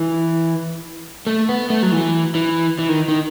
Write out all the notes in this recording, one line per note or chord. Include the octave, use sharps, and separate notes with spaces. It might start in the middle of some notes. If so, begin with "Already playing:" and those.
Already playing: E3
A3
B3
A3
F#3
E3
E3
E3
D#3
D#3